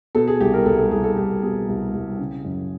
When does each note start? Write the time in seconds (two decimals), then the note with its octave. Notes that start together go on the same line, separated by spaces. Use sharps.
0.15 B2 A4
0.28 G#4
0.40 C2 G4
0.53 A#4
0.66 C2 A4
0.78 A4
0.91 C2 G#4
1.04 A4
1.17 C2 G4
1.42 B2 G#4
1.68 C2
1.93 C2
2.19 C#3
2.45 F#2